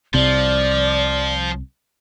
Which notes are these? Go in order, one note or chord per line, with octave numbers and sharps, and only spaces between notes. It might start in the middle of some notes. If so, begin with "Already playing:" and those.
C2 C3 F3 D5